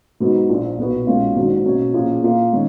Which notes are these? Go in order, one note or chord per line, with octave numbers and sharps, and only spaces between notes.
G#2 F#3 B3 D#4
A#1 A#2 F3
B1 A#2 F#3 B3 F#4
B1 A#2 G#3 C#4 F4
A#1 G#2 D#3 F#3
B2 A#3 C#4
A#2 F3 A#3 C#4 G#4
A#2 F3 A#3 F4
D#3 G#3 C#4